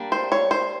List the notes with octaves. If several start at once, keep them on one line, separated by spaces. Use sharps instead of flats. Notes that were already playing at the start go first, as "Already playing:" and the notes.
Already playing: G3 A#3 D4
C5
C#5
C5